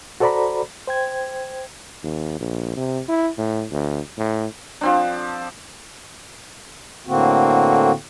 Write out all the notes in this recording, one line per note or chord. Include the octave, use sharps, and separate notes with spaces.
F#4 A4 C5 D5 A#5 B5
C5 G5 G#6
D#2
A#1
C3
E4
A2
D2
A2
F3 C4 D4
A2 D3 A#3 C4 F#4